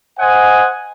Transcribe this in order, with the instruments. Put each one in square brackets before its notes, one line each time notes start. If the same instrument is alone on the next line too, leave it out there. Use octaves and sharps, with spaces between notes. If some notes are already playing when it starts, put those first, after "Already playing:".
[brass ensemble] C5 D#5 F#5 G#5